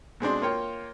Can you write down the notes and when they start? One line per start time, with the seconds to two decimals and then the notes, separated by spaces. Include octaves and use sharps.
0.20 B2 G#3 C4 D4
0.42 A#3 F4 C#5 G5